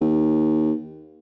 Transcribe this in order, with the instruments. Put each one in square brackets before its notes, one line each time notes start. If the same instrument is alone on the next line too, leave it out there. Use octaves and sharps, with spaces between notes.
[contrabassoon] D#2